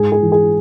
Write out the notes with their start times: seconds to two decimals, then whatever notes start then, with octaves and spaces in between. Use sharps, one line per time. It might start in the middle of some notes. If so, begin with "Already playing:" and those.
Already playing: G#2 G#4
0.12 G#4
0.22 E3
0.32 G#4